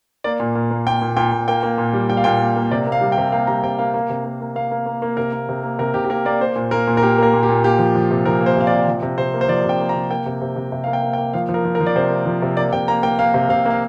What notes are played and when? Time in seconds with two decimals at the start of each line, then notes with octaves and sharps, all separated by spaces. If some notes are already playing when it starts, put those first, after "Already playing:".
0.24 A#3 D5
0.40 A#2
0.55 A#2
0.71 A#3
0.87 A#2 G5
1.01 A#2
1.17 A#2 G5
1.32 A#2
1.48 A#3 G5
1.63 A#3
1.78 A#2
1.93 G3
2.09 G3 G5
2.17 F5
2.24 A#2 G5
2.40 A#3
2.56 A#3
2.71 C3 D5
2.86 A#3
2.92 F5
3.01 G3
3.12 G5
3.18 C3
3.32 A#3 F5
3.47 G3 A#5
3.63 C3 G5
3.79 A#3 F5
3.94 A#3
4.09 C3
4.24 A#3
4.41 A#3
4.55 A#3 F5
4.71 A#3
4.86 A#3
5.02 A#3
5.17 C3 A#4
5.33 A#3
5.49 C3
5.63 A#3
5.79 C3 A#4
5.94 C3 G4
6.04 G4
6.09 A#3 A#4
6.25 A#3 D5
6.41 A#3 C5
6.56 A#2
6.71 A#3 A#4
6.87 A#2
6.97 A#4
7.03 A#3 G4
7.18 A#3 A#4
7.33 A#2
7.43 G4
7.49 A#2
7.64 A#3 G4
7.79 F3
7.95 F3
8.11 C3
8.25 F3 A#4
8.41 A#3
8.46 C5
8.56 C3 F5
8.67 D5
8.72 C3
8.88 F3
9.02 C3
9.18 C3 C5
9.34 A#3
9.41 C5
9.48 F3 D5
9.64 C3
9.69 G5
9.80 A#3
9.89 A#5
9.95 C3
10.10 A#3 G5
10.26 C3
10.41 C3
10.56 C3
10.72 C3
10.84 A#3 F5
10.93 G5
11.02 A#3
11.13 G5
11.18 A#3
11.33 F3 F5
11.49 F3
11.54 A#4
11.65 F3
11.75 A#4
11.81 F3
11.87 D5
11.95 C3 C5
12.10 A#3
12.26 F3
12.42 C3
12.57 A#3 D5
12.72 C3 G5
12.88 A#3 A#5
13.03 A#3 G5
13.19 A#3 F5
13.34 C3
13.49 C3 F5
13.65 A#3 F5